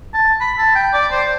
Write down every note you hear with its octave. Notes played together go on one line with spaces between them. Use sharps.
A5
B5
A5
G5
D5
C5